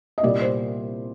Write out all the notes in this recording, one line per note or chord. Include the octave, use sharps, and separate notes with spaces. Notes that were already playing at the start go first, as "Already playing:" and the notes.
D#5
C2 A#2 G3 D5
C5